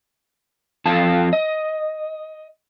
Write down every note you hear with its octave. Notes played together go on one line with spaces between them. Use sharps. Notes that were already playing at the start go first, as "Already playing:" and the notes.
F2 F4 A4 A5
D#5